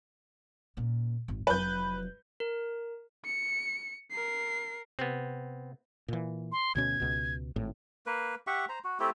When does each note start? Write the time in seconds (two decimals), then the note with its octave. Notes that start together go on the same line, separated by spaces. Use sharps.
0.77 A#2 C#3
1.28 G#1
1.47 F1 F#3 B4 G6
2.40 A#4
3.25 C#7
4.11 A#4 C7
4.99 C3 B3 C4
6.08 A#2 E3
6.52 C6
6.75 D2 B2 C#4 G#6
7.00 C#2 B2
7.56 G#1 A2
8.06 A#3 B4
8.47 G4 E5 F#5 C#6
8.69 C5 A#5
8.84 F#4
9.00 A3 C4 E4 G4